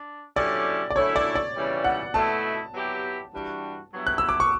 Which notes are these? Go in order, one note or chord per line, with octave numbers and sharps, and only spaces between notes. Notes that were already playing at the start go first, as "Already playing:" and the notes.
Already playing: D4
D3 F#3 C#4 E4 G4 D5
D5
F#2 D3 A3 E4 C#5
D5
D5
C#3 E3 G3
F#5
B2 A3 E4 A5
F#3 B3 E4 G4
G2 E3 G3 D4 F#4
G2 F#3 B3 E4
F#6
E6
D6
C#6